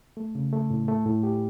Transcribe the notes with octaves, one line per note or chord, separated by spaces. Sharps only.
A3
C#3
A3
A2
A3
A2
G4